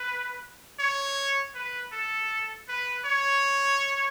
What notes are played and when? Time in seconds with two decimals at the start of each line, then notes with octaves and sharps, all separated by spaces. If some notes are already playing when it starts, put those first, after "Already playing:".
Already playing: B4
0.79 C#5
1.55 B4
1.92 A4
2.69 B4
3.06 C#5